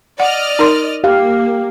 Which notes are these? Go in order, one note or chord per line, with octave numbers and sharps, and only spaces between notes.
D5 D#5 F#5 F6
D#4 A#4 C6
A#3 G4 F5